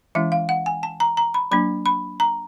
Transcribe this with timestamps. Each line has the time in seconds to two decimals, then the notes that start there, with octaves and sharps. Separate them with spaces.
0.15 E3 G#3 C#4 E4 E5
0.32 F5
0.49 F#5
0.66 G#5
0.83 A5
1.00 A#5
1.17 A#5
1.34 B5
1.51 F#3 A#3 D4 B5
1.86 B5
2.20 A#5